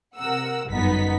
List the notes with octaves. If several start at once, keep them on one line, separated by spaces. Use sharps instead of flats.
C3 A#4 F#5 E6
G1 F#2 B3 D#4 B6